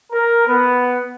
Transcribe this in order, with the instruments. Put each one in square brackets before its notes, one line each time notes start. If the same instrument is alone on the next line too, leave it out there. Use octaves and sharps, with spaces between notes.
[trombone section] A#4
B3